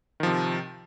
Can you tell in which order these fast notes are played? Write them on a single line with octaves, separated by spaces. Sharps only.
D#3 F3 C3